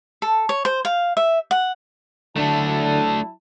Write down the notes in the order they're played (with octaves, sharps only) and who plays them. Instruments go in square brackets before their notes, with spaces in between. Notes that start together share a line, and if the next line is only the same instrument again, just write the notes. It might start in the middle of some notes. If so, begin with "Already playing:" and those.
[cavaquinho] A4
C#5
C5
F5
E5
F#5
[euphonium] D3 [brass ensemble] F#3 E4 A5 [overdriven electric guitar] A3 D4